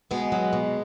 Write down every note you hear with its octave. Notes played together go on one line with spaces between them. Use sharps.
B2 G#3 B3
F#3
B2